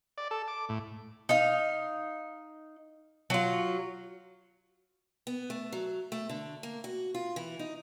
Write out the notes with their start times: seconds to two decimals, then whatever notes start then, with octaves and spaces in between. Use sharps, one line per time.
0.18 D5
0.31 A4
0.48 D6
0.69 A2
1.29 D#4 F5
3.30 F#3 F4
5.27 B3
5.50 A3
5.72 F#3
6.12 A3
6.29 D3
6.63 A#3
6.84 F#4
7.14 F4
7.36 E3
7.59 D#4